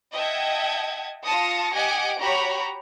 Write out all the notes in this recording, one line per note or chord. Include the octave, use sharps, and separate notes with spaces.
D#5 E5 F#5 G5 A5 G#6
F4 A5 D#6 A#6 C#7
G4 D#5 F#5 G#5 D7
F#4 G4 C#5 A#5 B5